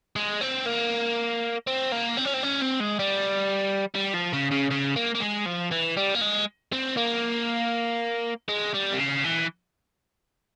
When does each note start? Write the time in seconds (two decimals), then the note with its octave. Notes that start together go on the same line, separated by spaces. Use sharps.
0.16 G#3
0.41 C4
0.66 A#3
1.67 C4
1.92 A#3
2.17 C4
2.25 C#4
2.34 C4
2.43 C#4
2.62 C4
2.80 G#3
2.99 G3
3.95 G3
4.13 F3
4.33 C#3
4.51 C#3
4.71 C#3
4.96 A#3
5.15 A#3
5.20 G#3
5.46 F3
5.71 E3
5.96 G3
6.15 A#3
6.21 G#3
6.73 C4
6.97 A#3
8.49 G#3
8.74 G3
8.93 C3
8.99 C#3
9.24 E3